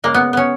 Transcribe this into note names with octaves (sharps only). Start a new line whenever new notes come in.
C#3 G#3 A#3
B3
B3 C#4